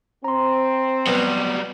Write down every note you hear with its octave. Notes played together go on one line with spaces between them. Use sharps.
C4 A#5 C6
B2 F#3 G3